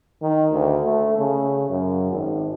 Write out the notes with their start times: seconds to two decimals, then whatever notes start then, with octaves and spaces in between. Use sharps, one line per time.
0.22 D#3
0.52 D2
0.85 A3
1.18 C#3
1.70 F#2
2.11 G#1